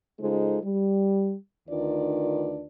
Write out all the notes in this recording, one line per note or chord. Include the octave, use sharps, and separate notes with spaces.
C#3 G#3 D#4 F4 A4 C5
G3
D2 D#3 D4 F4 B4 D5